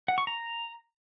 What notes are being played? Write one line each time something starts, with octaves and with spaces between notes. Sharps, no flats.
F#5
C#6
A#5